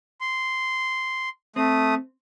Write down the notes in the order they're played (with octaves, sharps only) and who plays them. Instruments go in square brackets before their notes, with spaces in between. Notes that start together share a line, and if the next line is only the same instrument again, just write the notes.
[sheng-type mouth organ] C6
[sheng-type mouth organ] A3 D#6 [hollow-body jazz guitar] C4